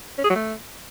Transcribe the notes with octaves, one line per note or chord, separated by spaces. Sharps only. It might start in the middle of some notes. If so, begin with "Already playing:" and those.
C#4
G#4
F#3
A3